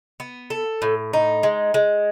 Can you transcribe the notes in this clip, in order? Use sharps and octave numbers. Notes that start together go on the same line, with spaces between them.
B3
A4
A2
D#4
G#3
G#3